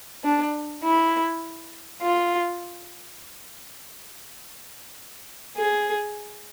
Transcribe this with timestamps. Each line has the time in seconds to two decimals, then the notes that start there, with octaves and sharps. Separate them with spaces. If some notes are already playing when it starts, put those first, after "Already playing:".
0.24 D4
0.84 E4
2.02 F4
5.57 G#4